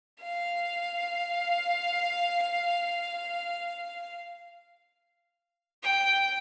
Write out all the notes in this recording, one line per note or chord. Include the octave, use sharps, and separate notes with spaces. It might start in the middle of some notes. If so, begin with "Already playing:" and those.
F5
G5